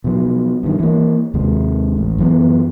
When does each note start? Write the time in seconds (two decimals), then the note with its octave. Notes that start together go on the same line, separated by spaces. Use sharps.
0.04 B2 F3 F#3
0.63 G2 D#3
0.80 E3 A#3
1.34 D#2 C3 G#3
1.97 A1
2.18 F#2 E3 B3